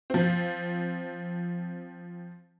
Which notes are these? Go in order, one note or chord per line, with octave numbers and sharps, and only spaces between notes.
F3 C4